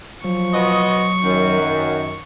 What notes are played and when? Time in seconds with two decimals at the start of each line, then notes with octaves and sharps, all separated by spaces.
0.25 F3 F#3 C#6
0.53 B2 C5 D#5
1.24 F#2 D#3